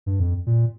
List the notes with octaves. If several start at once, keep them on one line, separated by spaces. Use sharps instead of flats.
G2
F2
A#2